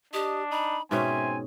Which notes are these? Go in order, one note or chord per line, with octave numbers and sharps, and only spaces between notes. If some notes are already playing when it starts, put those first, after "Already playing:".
D4 G4 D#5
D#4 B5
G#2 B2 C4 C#4 E5 G#5